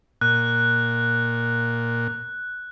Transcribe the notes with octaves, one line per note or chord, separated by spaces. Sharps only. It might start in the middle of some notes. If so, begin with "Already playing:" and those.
A#2 F#6